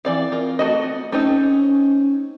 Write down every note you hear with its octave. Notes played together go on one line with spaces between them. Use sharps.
E3 C4 D5 F5
F4 A#4
A3 F#4 D#5
A3 C4 C#4 D#4